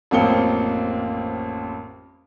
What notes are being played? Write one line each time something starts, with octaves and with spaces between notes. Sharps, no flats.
A1 F2 A#3 C4 C#7 G7